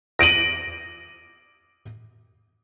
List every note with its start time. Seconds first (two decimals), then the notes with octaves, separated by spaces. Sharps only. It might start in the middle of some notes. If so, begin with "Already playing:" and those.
0.19 A#6 D7 D#7 F#7